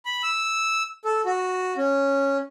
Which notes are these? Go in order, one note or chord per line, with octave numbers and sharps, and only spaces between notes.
B5
E6
A4
F#4
C#4